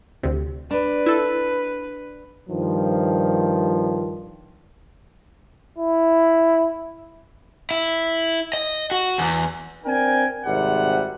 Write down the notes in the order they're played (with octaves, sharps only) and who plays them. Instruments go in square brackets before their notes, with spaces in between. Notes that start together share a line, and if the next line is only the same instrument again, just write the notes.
[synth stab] D2 C3
[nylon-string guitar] D4 [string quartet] B4
[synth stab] E4 A4
[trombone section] G2 D#3 F3
[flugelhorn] E4
[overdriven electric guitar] E4
D#5
F#4
E2
[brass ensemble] C4 D4 A#4 G5 G#5
G#1 C3 G3 F#5